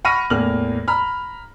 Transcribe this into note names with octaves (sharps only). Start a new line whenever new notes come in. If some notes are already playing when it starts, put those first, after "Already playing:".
F#5 B5 C#6 F6 A#6 D#7
E2 A2 A#3 F6 F#7
A#5 B5 F6